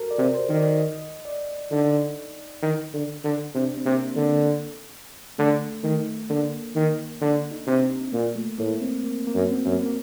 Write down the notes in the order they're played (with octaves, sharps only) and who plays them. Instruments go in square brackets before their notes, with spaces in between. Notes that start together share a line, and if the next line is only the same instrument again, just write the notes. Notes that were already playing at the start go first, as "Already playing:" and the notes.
Already playing: [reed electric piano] F#4 A4 A#4
D5
[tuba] C3
[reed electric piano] C5
[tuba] D#3
[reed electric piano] D5
D#5
D5
[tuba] D3 [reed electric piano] D#4
[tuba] D#3
D3
D3
[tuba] C3 [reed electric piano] D4
[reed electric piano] C4
[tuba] C3 [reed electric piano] A#3
[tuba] D3 [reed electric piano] A#3
[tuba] D3 [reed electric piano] A3
[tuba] D#3 [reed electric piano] A3
[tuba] D3 [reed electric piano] A#3
[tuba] D#3
[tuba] D3 [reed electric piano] D4
[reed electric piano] D#4
[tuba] C3
[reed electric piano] C4
[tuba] A#2 [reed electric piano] A#3
[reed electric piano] A3
[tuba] A2 [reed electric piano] A#3
[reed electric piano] C4
A#3
A#3
[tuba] F#2
[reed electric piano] C4
[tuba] F#2
[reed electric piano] A#3
A#3